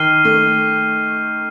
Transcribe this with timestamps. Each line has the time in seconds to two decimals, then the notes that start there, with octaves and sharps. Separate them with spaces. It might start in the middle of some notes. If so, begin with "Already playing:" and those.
Already playing: D#3 D6 F6 C7 D#7 G7
0.25 A3